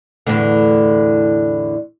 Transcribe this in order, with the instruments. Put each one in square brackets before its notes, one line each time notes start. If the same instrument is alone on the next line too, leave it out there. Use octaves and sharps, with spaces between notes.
[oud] E2 A2 D3